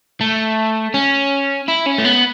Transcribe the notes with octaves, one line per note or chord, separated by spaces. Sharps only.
A3
C#4
E4
C#4
A3
B3